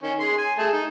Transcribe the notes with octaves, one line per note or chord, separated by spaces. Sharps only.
D#3 C#4
G#4 C6
G#5
A3 G#4 A5
D#4